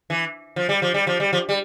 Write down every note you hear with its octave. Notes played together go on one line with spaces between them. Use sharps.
E3
F3
G3
F3
G3
F3
G3
F3
G3